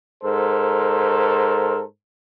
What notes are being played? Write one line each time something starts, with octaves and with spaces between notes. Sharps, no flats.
G#2 A4 A#4 C5